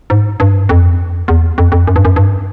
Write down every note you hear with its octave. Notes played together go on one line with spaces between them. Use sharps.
G#2
G2
F2
E2
F2
F2
F#2
G2
F#2
G2